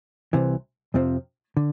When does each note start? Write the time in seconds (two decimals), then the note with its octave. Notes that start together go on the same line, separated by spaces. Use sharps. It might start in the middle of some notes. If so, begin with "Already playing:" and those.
0.33 C2 C3 E3
0.94 F2 C3 F3 C4
1.57 D3